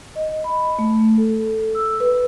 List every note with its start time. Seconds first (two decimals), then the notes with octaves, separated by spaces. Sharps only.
0.16 D#5
0.44 B5
0.79 A3
1.18 A4
1.75 E6
2.00 B4